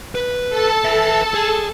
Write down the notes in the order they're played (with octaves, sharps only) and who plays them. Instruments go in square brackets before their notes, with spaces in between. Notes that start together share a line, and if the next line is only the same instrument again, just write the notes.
[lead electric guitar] B4
[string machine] A4 A5
[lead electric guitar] B4 E5
G#4